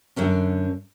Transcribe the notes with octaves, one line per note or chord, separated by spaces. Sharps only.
F#2 D3 C#4 D4